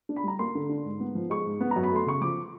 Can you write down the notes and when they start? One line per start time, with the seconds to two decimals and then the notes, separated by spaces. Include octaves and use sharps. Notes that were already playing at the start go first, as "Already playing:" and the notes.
0.09 D4
0.16 B5
0.24 G3 A#5
0.39 A#3 C6
0.55 D3
0.69 D4
0.85 G#2
1.00 B3
1.15 F3
1.30 G#3 C#6
1.45 G#2
1.61 B3
1.71 F#2 A#5
1.83 B5
1.91 A3 C6
2.06 C#3 C#6
2.21 F3 D6